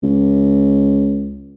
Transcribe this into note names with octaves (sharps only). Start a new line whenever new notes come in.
C#2